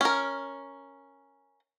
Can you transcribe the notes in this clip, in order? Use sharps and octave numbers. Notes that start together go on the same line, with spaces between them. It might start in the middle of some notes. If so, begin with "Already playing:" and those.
C#4 A#4